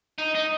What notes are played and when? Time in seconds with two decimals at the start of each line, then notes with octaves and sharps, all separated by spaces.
0.18 D#4
0.35 D#4